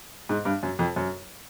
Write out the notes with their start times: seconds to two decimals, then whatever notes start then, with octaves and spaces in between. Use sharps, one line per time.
0.29 G#2
0.45 G2
0.63 F#2
0.79 F2
0.96 F#2